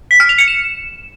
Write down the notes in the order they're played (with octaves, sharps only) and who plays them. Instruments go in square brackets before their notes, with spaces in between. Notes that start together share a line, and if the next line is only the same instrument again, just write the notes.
[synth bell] B6
F6
F7
C#7
E7